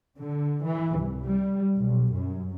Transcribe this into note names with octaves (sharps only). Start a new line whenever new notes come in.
D3
E3
C2
G3
B1
F#2